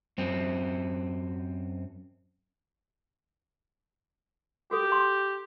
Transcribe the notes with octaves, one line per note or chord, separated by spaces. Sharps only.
F#2 C4
F#4 G4 A4
C6